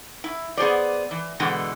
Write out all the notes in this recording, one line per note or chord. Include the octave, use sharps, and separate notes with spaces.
E4
B3 G#4 C5 D5
E3
B2 D3 E3 G#3